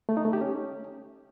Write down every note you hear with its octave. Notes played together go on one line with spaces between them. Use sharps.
A3
D#4
A3
G4
C#4